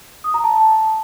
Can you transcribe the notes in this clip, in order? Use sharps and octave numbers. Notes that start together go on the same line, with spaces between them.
D#6
A#5
A5